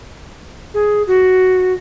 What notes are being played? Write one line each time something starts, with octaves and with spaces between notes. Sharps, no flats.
G#4
F#4